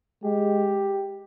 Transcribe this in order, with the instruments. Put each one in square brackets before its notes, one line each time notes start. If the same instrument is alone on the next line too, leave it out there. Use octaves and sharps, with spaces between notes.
[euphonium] G#3 [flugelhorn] G4